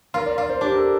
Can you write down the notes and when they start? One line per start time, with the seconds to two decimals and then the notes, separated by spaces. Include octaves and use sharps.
0.14 F4 A#4
0.26 D5
0.38 F4 D5
0.50 C5
0.61 D4 G4
0.72 A#4
0.77 A4